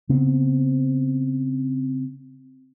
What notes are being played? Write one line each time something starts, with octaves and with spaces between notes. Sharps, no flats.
C#3 B3 C4